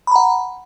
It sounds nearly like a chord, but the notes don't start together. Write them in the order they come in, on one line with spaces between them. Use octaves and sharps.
B5 A#5 F#5